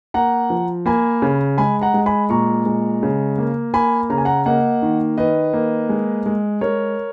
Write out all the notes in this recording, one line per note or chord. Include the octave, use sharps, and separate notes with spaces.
A#3 F#5 A#5
F3
A#3 G#5 B5
C#3
G#3 G#5 B5
F#5 A#5
G#3
G#5 B5
A#2 A#5 C#6
G#3
C#3
A#3
A#3 G#5 B5
C#3 A#5
G#5
F#5 A#5
A#3 D#5 F#5
D#3
D#3 B4 D#5
A#3
G#3
G#3
G#3 A#4 C#5